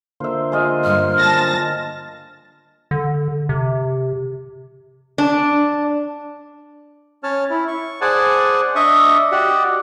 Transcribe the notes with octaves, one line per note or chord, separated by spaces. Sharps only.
D3 A#3 F4 C5 E5
G#3 F4 D#5
G2 F6
A5 A6 A#6
D3
C3
D4
C#4 C#5 A5 F6
E4
C#6
G#4 C5 D5 F#5 G#5 A5
D4 D#5 E5 C#6 D#6
F#4 G4 D5 D#5 F#5